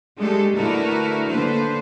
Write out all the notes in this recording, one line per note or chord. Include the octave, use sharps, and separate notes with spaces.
G#3 A3 D4 G4 A4
D3 A3 E4 F#4 A#4 B4
D3 A#3 B4 C5